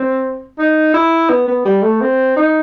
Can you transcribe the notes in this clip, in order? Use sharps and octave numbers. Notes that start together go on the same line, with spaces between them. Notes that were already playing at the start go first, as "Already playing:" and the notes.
Already playing: C4
D#4
E4
B3
B3
G3
A3
C4
D#4